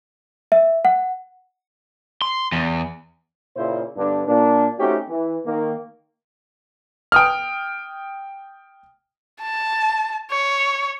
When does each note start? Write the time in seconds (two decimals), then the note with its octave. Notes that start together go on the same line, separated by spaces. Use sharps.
0.52 E5
0.85 F#5
2.22 C6
2.52 E2
3.57 A#2 C#3 E4 C5
3.97 G2 D3 B3 D4
4.27 A#2 A#3 D4
4.80 A3 C4 C#4 D#4 F#4 G4
5.09 E3
5.46 D#3 A#3
7.12 G5 D#6 F6
9.41 A5
10.31 C#5